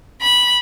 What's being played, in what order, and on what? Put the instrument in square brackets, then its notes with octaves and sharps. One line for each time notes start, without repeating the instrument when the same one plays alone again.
[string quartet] B5